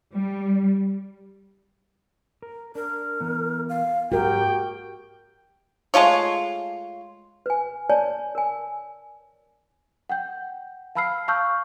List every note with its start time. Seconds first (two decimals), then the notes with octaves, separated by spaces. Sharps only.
0.13 G3
2.42 A#4
2.75 D4 A#4
3.20 E3 B3
3.69 F5
4.12 G#2 F#3 F#4 G4 A#4 G5
5.94 G#3 A3 F4 C#5
7.46 B4 G#5
7.90 C#5 D5 G#5 A5
8.35 A#4 G#5
10.09 F#5 G5 G6
10.95 F5 A5 B5 E6 F6 C7
11.28 F5 A5 C#6 E6 F6 G6